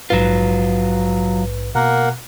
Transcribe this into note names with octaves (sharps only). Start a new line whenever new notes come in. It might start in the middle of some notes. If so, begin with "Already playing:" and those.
A#1 G#2 F#3 F4 B4
B2 A#3 A#4 F#5